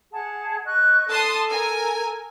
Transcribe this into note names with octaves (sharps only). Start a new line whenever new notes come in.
G#4 F#5 A5
D#5 C#6 F#6
A4 A5 C6 D#6
A#4 G#5